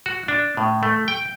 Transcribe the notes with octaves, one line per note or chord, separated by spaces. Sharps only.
F#4
D4
A2
A3
G5